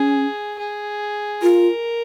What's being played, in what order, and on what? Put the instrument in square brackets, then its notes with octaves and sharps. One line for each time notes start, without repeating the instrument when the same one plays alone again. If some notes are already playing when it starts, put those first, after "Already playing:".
Already playing: [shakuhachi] C#4 [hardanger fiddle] G#4
[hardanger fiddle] G#4
[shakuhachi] F4 [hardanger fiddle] A#4